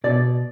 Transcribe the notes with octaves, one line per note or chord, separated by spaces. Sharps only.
B2 D5